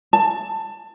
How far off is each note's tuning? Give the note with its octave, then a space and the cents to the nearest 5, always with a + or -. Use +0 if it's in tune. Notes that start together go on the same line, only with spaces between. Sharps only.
A5 +20